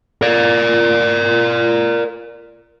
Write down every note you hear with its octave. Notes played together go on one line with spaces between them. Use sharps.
A#4 D5